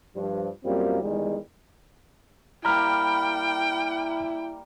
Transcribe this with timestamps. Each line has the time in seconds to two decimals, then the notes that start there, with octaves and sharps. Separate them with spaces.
0.16 G2 F3
0.64 F#2 G3 A#3 C4 F4
1.02 E2 D#3 G3 G#3
2.65 G3 A#3 E4 G5 A#5 B5 F6